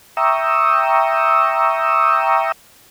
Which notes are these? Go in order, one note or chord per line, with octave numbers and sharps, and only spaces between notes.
E5 G5 A#5 C#6 D#6 E6